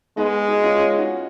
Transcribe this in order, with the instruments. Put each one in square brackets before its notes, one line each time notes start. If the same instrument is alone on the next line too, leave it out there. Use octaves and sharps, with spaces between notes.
[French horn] G#3 [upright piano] B3 D#4
[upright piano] D#4 F#4
C#4 F4
C#4 F4
D#4 F#4